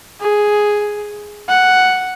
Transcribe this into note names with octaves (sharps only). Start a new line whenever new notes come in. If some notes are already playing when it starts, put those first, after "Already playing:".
G#4
F#5